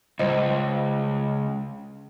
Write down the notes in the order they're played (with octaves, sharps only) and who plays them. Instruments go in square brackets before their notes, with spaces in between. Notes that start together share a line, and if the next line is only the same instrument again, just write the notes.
[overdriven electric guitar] C#2 [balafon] G3 C5 D#5